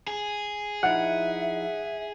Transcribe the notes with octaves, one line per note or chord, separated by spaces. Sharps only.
G#4
F3 D#4 E4 E5 F#5